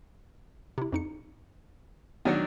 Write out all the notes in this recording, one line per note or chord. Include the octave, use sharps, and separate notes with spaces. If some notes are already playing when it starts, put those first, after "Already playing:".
C3 E4
F2 D#4 C#7
D#3 F#3 B3 D4 C#5 F#5